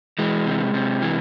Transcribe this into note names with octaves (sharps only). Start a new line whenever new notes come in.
E3 G#3
C3
C3
E3